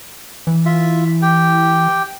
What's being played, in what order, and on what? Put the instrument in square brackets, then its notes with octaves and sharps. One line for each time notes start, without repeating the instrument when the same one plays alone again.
[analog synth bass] E3
[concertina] F4 E5
G4 G5